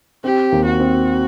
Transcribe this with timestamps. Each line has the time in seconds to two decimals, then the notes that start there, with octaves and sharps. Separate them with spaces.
0.24 C4 G4
0.52 D#2
0.66 F#4
0.80 C4